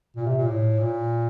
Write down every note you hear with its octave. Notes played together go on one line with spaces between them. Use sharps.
A#2
C3
A#2
A2
A#2